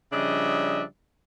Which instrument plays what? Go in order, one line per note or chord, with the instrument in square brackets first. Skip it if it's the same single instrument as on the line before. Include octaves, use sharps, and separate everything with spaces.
[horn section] C#3 F3 G3 D4 D#5 E5